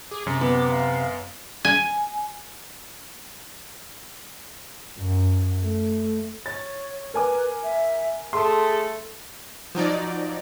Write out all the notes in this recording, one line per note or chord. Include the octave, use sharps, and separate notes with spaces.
G#4 D6
F#2 C3
B3
F5
G#5
F#2
A3
C#5 A6
A#4 B4 G#5 D6
E5
A3 G#4 A4 C6
F3 F#3 D#4 D5